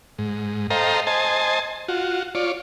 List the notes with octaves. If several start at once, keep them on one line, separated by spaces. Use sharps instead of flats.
G#2
A4 C5 D#5 F5 G5 A#5
C5 D#5 G#5 A5
F4 F#4
F4 C#5 D5